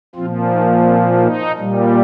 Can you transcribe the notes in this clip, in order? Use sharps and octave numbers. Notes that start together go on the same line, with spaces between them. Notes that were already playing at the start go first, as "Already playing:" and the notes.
A#2 F3 C4 F4
D#4
C4
D#4
A#2 G3